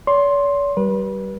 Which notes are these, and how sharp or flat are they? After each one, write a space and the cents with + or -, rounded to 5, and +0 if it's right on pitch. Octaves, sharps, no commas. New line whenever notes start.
C#5 +45 C6 +10
G3 -30 B4 -30